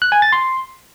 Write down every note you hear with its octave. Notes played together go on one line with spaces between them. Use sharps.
F#6
G#5
A6
C6